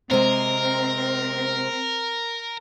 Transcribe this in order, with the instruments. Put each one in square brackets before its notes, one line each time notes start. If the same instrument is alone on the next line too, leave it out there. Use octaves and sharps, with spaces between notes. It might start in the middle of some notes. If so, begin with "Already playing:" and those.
[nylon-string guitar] C3 G#3 [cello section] C4 [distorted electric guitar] A#4